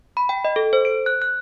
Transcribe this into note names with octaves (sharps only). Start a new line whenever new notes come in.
B5
G5
D#5
A4
C5
D7
F#6
F#6